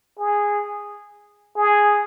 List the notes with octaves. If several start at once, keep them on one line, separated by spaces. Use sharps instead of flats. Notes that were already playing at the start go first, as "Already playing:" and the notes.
G#4
G#4